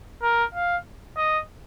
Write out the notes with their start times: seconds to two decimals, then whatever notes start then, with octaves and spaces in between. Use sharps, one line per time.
0.22 A#4
0.54 F5
1.17 D#5